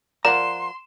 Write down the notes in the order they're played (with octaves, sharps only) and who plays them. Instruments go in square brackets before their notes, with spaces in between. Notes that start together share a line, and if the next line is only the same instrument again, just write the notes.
[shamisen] F3 A#4 D5 [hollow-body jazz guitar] F#5 A#5 [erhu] C6 [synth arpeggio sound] E7